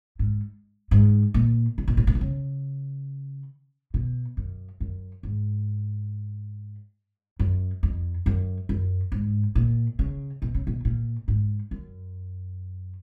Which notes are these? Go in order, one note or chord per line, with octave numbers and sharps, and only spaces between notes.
G#2
G#2
A#2
C#3
B2
A#2
B2
D#3
C#3
B2
F#2
F#2
G#2
F#2
F2
F#2
F#2
G#2
A#2
C#3
B2
C#3
B2
A#2
G#2
F#2